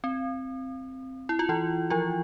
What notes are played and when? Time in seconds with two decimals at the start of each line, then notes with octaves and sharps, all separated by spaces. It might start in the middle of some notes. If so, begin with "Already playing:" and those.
0.04 C4
1.29 E4
1.39 F4
1.49 E3 E4
1.90 F3 F4